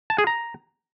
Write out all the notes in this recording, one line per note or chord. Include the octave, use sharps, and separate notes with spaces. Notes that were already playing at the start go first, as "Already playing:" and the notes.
A5
G#4
A#5